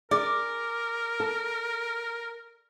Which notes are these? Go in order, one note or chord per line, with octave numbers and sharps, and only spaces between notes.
G#4 A#4 D5
A4 A5